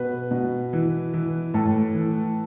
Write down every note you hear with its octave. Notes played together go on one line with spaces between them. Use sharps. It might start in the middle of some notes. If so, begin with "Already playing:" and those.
Already playing: B2 B4
B2
E3
E3
A2 A4
E3